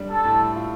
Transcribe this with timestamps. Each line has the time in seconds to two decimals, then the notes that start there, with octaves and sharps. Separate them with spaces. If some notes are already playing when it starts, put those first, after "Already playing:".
Already playing: G3 D4
0.10 A4
0.24 A2
0.56 F4